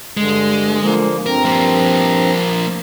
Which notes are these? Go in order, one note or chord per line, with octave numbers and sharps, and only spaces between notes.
G2 D3 G#3
D3 F3 A#3
G2 C4 A#4 A#5
F3 A#3